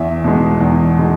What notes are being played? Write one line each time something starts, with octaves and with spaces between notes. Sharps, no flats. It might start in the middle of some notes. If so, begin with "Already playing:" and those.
Already playing: E2 E5
B2 G#3
E2
B2 G#3